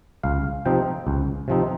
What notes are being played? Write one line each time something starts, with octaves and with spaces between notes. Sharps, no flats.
C#2 F5
C3 F3 C4 D#4 G5
C#2
C3 F3 C4 D#4